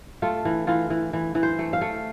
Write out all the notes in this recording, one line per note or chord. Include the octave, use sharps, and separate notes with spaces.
A3 F4
E3
E3 F4
E3
E3
E3
C5
A3
F5
A3